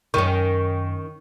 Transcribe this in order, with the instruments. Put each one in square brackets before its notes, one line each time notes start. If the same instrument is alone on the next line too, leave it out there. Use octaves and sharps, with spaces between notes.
[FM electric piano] F#2 C#6 [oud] D#3 C#4